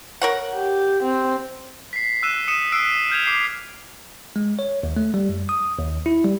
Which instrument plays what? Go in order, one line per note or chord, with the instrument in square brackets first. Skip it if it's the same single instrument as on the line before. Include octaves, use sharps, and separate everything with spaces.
[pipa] A#4 C#5 F#5
[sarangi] G4
C4
[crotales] B6 C7
E6 F#6 D#7 E7
D#6 C#7 D#7 E7
D#6 E6 F#6 B6 C7 D7
F6 G6 G#6 F7
D6 C7
[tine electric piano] G#3
C#5
D#2
A3
G3
F#2
D#6
D#2
E4
G3